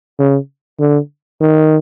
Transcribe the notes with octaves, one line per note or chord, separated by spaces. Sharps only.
C#3
D3
D#3